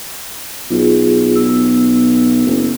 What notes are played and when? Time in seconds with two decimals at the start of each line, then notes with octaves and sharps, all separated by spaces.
0.70 B1 F4 G#4
1.36 B3 E6
2.47 F#1